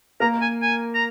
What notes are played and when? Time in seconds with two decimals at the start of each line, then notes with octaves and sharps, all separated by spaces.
0.20 A#3 A#4 A#5
0.42 G#5
0.62 G#5
0.95 A#5